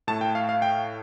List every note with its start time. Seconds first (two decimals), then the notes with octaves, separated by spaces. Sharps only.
0.07 A2 A3 A5
0.21 G5
0.35 F5
0.49 F5
0.62 G5